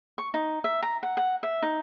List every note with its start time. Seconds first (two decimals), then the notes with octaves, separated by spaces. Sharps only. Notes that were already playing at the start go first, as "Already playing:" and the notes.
0.18 C#6
0.34 D#4
0.64 E5
0.82 A#5
1.03 F#5
1.17 F#5
1.43 E5
1.62 D#4